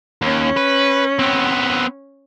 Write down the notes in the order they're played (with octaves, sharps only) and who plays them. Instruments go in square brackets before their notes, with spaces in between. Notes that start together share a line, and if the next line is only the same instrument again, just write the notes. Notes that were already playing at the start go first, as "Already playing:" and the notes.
[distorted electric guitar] D#2 [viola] C#4
[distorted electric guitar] B4
B3 C4